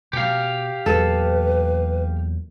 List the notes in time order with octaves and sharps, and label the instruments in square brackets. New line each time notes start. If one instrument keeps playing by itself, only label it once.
[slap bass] B2 [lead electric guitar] G4 F5
[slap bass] E2 A#2 F#3 [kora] A4 [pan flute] B4